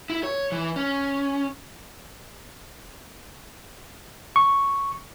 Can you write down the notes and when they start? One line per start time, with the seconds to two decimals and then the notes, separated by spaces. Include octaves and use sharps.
0.10 E4
0.24 C#5
0.52 E3
0.76 C#4
4.36 C#6